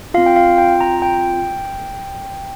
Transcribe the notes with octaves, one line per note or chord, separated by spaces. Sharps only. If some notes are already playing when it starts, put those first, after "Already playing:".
C4 F4 F5
G5
F5
G5
A#5
G5